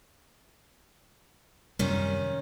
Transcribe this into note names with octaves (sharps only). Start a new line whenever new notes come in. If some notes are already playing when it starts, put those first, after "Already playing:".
F#2 C3 D#3 G3 C#4